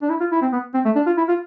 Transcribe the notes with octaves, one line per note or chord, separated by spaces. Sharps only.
D4
E4
F4
E4
C4
B3
C4
A3
D4
F4
E4
F4